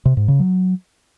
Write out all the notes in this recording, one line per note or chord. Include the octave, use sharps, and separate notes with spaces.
C3
G#2
C#3
F#3